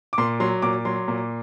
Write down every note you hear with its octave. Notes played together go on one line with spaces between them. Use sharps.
D6
A#2 C6
F#3 C6
A#2 D6
F#3 C6
A#2